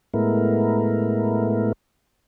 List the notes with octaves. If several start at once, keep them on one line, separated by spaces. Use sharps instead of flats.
A2 G#3 A3 B3 E4 A#4